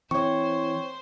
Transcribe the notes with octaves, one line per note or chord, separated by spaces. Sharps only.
E3 C4 C5 C#5 C#6